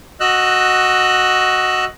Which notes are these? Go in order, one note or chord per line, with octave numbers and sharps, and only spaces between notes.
F#4 D#5 E6 F#6